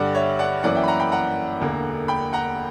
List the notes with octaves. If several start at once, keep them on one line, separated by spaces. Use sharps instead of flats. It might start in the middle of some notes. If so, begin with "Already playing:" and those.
Already playing: G2 D3 G3 D5 F#5
C#5 E5
D5 F#5
F#2 E3 A#3 C#4 D5 F#5
E5 G5
B5
F#5 A#5
G5 B5
F#5 A#5
E1 D2 D3 A#3
G5 B5
F#5 A#5